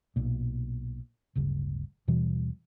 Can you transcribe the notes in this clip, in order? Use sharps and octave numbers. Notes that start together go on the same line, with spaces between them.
B1 A#2
D1 G1 C#3
D#2 B2 E3 G3